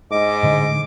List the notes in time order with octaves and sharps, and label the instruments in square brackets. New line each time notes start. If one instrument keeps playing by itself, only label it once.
[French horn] G#2 [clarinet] D#5 [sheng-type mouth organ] D6
[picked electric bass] A2 D3 G#3